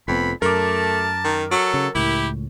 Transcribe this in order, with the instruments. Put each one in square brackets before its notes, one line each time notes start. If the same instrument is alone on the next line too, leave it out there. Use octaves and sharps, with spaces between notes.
[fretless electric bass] F1 B3 [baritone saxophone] F2 [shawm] B5
[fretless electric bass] F#2 [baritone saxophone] A3 [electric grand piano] A#4 D6 [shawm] A5
[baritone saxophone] D#3
[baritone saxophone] F#3 [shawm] A4
[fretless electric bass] C#3
[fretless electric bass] C#2 A2 [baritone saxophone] E4 [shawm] G4